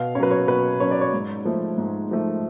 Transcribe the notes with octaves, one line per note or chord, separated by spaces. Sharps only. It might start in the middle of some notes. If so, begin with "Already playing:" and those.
Already playing: B2 F5
F#3 C#4 B4 C#5
C#5
B2 B4
F#3 C#4 C#5
D5
C#5
G#2
F3 A3
G#2
F3 A3